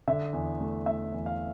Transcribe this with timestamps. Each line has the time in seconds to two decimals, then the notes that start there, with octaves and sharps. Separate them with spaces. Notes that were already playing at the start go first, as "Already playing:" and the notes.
0.08 D3 E5
0.33 E2
0.60 A3
0.86 A3 E5
1.13 E2
1.26 F5